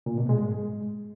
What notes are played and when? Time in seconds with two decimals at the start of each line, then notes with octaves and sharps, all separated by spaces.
0.06 A#2
0.18 B2
0.29 G#3
0.41 G#2
0.52 G#3